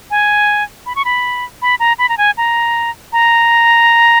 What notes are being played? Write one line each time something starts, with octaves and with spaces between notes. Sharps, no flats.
G#5
B5
C#6
B5
B5
A#5
B5
A#5
G#5
A#5
A#5